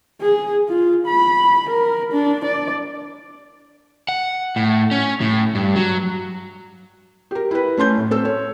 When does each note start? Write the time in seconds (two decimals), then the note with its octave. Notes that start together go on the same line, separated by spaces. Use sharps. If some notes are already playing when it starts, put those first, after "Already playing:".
0.21 G#4
0.69 F4
1.07 B5
1.70 A#4
2.13 D4
2.45 D5
4.09 F#5
4.56 A2
4.91 C#4
5.21 A2
5.55 G2
5.76 F#3
7.31 G4 A#4
7.51 E4 B4
7.77 A3 C#4 C6 G6
7.97 A2
8.11 C4 A4 E6
8.25 C#5